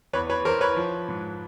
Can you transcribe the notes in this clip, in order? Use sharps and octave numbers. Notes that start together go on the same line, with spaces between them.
E2 B4 C#5
B4 C#5
E3 A#4 C5
B4 C#5
F3
G#2